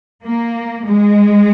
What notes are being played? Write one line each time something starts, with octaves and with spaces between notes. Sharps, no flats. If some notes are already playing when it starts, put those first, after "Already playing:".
A#3
G#3